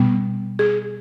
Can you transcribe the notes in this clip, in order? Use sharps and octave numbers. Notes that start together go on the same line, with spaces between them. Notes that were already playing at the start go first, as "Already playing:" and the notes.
Already playing: B2 G3 B3
G#4